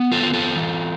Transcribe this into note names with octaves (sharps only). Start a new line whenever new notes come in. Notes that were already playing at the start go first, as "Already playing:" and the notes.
Already playing: B3
F4 A4
F4
F4 A4
E3